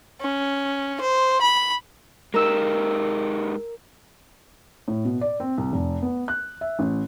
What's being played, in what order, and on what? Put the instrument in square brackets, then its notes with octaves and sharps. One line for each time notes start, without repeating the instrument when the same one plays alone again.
[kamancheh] C#4
C5
B5
[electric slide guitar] G#3 D#4 G4 [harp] A#4 E6
[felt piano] A2
B2
D5
C4
C2
F1
B3
F#6
E5
A1